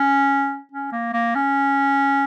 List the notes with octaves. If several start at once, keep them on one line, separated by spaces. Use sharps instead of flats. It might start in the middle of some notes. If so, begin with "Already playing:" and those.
Already playing: C#4
C#4
A#3
A#3
C#4